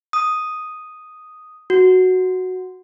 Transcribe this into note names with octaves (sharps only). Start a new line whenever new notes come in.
D#6
F#4